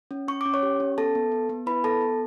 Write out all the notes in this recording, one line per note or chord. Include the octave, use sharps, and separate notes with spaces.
C#4
C#4 C#6
C#4 D6
C#5 C#6
G4
C#4
B3 A4 A5
B3
B3
B3
E4 B4 B5
B3 A4 A5
B3